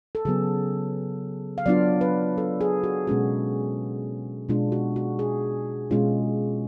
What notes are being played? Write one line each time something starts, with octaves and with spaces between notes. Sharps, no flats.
A4
C#3 F#3 B3 G#4
F5
F#3 B3 D4 F4 D5
B4
A4
G#4
F#4
B2 G#3 C#4 F#4
B2 G#3 D4 F4
F#4
F#4
G#4
B2 G#3 C#4 F4